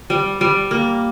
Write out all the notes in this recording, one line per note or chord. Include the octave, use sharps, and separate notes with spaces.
G3
G3
A#3